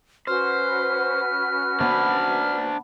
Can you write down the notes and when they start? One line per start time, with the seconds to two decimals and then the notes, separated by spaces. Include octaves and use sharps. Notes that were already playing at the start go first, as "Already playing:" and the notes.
0.27 C#4 F#4 B4 C5 F6
1.80 B3 D4 C5 D5